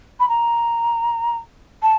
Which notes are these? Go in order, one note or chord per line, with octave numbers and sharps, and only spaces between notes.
B5
A#5
A5